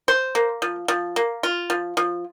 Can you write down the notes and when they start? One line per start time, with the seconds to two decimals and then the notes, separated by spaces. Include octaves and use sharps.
0.08 C5
0.35 A#3
0.62 F3
0.88 F3
1.16 A#3
1.43 F4
1.70 F3
1.97 F3